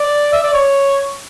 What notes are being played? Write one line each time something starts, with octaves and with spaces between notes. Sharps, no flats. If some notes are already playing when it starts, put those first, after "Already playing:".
Already playing: D5
E5
D5
C#5